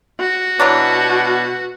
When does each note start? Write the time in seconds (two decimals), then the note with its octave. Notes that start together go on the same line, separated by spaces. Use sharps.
0.20 F#4
0.60 B2 E3 F#3 D4